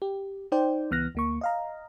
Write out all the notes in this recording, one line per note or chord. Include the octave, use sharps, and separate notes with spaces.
G4
D#4 C5 D5 G5
C#2 E3 B3 F6 F#6 A#6
D2 A#3 C#6
D#5 F5 A#5